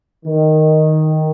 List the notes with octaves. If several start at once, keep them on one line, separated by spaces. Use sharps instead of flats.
D#3